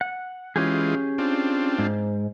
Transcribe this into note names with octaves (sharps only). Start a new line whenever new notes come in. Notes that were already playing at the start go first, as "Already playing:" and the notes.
F#5
E3 G#3 C#4 F4 G4 G#4
C4 D4 F4
G#2